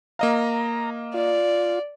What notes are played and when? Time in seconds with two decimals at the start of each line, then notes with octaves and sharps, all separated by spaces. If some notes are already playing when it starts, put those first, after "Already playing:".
0.19 A#3 D#5 F5 A#5
1.14 F4 D5